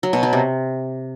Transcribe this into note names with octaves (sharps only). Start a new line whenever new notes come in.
F#3
B2
F#3
C3